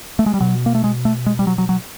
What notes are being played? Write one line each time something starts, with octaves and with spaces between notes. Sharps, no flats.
A3
G#3
G3
B2 F#3
A#3
A3
G#3
A3
G#3
G3
F#3
F#3
F#3